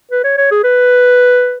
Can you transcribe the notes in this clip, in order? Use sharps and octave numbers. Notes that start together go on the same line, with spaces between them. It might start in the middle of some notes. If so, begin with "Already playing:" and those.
B4
C#5
C#5
G#4
B4